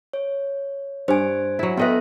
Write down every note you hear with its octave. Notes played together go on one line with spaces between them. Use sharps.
C#5
G2 C5 G#5
F#3 E4
B3 A4 B4 D#5 E5 G5